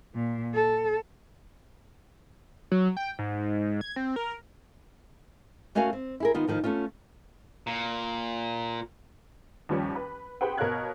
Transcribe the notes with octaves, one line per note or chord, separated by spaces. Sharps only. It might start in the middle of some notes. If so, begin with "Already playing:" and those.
A#2
A4
F#3
G5
G#2
G#6
C4
A#4
A3 C#4 F#4 A#4 F5 G#5
C4
E4 G#4 A#4
D#3 B3 F4
A2 D#3 F3
A3 B3 C#4 F4
A#2
D#2 F3 G3 C#4
B4
G4 G#4 B4 C5 F#5 G5
B2 A#4 C#5 F5 F#6 G#6